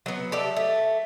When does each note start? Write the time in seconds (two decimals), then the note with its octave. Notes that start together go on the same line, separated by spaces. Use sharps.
0.06 F#3 B3
0.32 G4 A4 D5 E5
0.57 A3